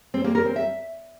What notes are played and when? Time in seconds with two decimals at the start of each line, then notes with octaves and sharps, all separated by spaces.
0.14 C4
0.24 A#3
0.35 A#4
0.45 C4
0.56 E5